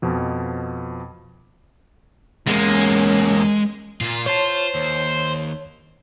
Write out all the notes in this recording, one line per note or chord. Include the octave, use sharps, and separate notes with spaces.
F2 B2 F3
E2 G#3 A#3 C#4
A#2 F4
C5 C#5 A5
D#2